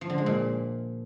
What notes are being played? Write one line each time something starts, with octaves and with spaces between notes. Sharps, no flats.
F3
D3
G#3
A#2